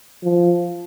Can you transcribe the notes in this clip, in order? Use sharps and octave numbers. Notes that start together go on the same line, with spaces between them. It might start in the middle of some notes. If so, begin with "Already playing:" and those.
F3